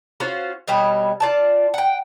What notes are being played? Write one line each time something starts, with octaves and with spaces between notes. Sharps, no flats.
C#4 F4 F#4 C5
B2 G3 C#5 D#5
F4 D5 A5
F#5 G5